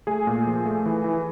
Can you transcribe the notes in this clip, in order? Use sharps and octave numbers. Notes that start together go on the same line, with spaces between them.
A3 G#4 G#5
A#2
F3
A3
E3
E3